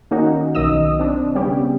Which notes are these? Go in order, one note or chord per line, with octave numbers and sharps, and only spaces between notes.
D#3 A#3 C#4 D#4 F#4
B1 D#3 D#5 D#6 E6
C4 D4
C#3 G3 B3 C#4 G4